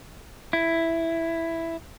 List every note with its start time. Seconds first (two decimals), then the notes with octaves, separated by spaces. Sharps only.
0.53 E4